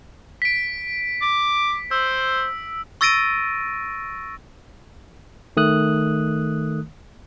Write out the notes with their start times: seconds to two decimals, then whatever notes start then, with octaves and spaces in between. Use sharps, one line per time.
0.42 B6 D7
1.22 D6
1.91 C5 E6
3.01 C#6 E6 A6 A#6 D7 D#7
5.57 D#3 A3 D#6 F#6